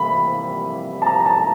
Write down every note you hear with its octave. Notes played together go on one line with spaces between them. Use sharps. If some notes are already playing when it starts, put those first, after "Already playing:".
Already playing: C3 E3 G3 A#3 B5
A5
A#5
A#5
A5